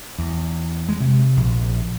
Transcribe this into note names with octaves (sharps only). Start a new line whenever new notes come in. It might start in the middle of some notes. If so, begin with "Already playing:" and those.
E2
G#3
C3
A#1